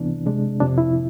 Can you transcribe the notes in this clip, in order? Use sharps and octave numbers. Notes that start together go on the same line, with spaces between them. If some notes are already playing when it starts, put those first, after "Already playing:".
Already playing: C2 C3 E3 B3 D4
C3 G#3 D4
F2 C3 F3 D4
E4